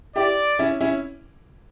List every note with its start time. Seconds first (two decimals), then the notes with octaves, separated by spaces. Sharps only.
0.16 E4 G4 D5
0.59 C#4 E4
0.81 C#4 E4